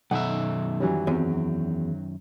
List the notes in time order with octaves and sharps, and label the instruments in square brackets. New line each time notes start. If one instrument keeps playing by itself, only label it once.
[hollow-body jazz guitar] B1 [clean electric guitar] F#2 D#3 E5 [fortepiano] F#5
[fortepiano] E3 F#3 G3
[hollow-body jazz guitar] E2 [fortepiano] F#3 C4